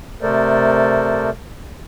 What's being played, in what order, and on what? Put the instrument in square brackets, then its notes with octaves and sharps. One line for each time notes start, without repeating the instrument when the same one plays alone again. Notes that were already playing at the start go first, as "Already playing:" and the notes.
[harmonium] C3 A3 A4 A#4 C5 D5